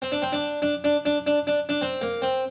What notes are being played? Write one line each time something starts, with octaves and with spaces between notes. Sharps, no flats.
C4
D4
C4
D4
D4
D4
D4
D4
D4
D4
C4
A#3
C4